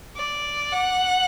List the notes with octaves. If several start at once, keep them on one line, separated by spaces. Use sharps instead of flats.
D5
F#5